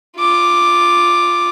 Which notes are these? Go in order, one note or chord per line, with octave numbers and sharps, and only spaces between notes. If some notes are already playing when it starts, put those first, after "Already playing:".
F4 D6